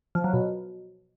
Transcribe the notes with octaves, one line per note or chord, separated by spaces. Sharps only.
F3
F#3
B2